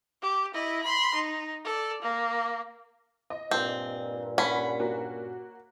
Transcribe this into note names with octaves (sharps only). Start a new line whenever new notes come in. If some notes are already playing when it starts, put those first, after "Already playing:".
G4
E4 D#5
B5 C6
D#4
A4 D5
A#3
D#5
G2 A#2 C4
C#4 F#5 B5 B6
A#3 F#4